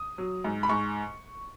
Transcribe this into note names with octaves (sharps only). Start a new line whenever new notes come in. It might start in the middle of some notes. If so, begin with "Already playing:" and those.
Already playing: D#6
F#3
G#2
B5
G#2 C#6